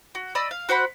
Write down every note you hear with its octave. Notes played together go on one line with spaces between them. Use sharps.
F#4
D5 D#5 B5 E6
F5
F#4 C5 F#5 B5